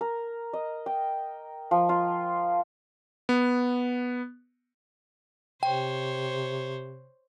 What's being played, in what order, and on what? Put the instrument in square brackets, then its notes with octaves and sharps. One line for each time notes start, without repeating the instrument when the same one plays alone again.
[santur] A#4
D#5
G5
F3
F4
[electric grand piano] B3
[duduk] C3 [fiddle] C5 C#5 [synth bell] G5